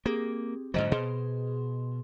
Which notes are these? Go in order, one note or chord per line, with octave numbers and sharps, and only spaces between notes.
A#3 C4 G4 G#4
G#2 D3 F#3 C5 D#5
B2 G#4 C6